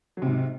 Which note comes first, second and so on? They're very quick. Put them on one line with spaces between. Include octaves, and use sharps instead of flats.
F#3 C3 G#2